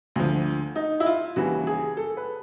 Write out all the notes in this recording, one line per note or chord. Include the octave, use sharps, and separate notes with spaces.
D2 D3 F3
D#4
E4
F4
D#2 C#3 E3 G3 F#4
G#4
A4
B4